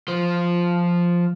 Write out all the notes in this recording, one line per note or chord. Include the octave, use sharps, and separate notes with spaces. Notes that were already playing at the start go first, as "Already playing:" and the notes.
F3 C5